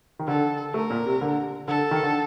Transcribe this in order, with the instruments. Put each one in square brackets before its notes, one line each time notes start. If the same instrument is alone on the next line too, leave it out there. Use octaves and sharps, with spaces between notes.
[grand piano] D#3
[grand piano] D3 [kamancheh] A4
[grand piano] A3 [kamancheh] A#4
[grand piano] A#2
C3
D3
[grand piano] D3 [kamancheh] A4
[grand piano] D#3
D3